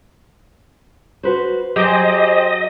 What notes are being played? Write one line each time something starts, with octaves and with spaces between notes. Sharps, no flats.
F#4 B4 C5
F#3 G4 G#4 C5 D#5